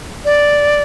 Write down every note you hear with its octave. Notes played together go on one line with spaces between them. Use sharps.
D5